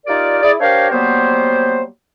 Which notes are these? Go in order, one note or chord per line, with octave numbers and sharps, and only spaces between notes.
D#4 F4 G4 A#4 D5
E4 G#4 D5
D4 G4 A#4 C5 C#5 F5
F#3 G3 A#3 B3 C5